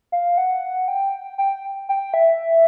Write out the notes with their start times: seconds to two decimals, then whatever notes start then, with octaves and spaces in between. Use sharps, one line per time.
0.12 F5
0.38 F#5
0.88 G5
1.38 G5
1.89 G5
2.14 E5